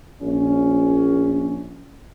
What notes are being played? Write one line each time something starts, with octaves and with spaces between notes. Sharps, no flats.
A#1 C#4